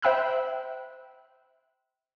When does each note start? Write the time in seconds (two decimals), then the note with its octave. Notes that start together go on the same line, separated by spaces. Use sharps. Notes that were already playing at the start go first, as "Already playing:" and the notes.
0.02 C5 E5 G5 B5 E6 F#6